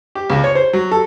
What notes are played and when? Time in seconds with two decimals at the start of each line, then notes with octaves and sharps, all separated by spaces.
0.15 G4
0.30 C#2
0.44 C#5
0.55 C5
0.73 F#3
0.91 A4